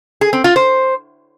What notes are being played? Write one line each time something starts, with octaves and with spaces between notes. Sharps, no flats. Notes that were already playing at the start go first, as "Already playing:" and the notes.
G#4
C4
F4
C5